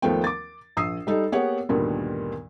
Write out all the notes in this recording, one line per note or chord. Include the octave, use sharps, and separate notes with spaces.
D#2 F3 A3 B3 G5
D6 A6
A#1 D#6 E6 C7
G3 D#4 A4
A#3 B3 G4 G#4 C#5 F#5
D2 G2 A#2 D#3 G3 B3